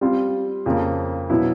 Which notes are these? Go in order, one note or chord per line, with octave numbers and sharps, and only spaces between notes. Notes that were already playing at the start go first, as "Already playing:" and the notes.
G3 C4 F4
F2 C#3 F3 A#3
B2 F#3 B3 E4